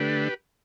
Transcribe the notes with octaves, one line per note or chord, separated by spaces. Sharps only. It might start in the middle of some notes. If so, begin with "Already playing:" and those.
Already playing: D3 A3 D4 G4 B4